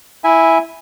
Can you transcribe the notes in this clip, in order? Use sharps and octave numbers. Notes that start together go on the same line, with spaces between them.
E4 E5 G#5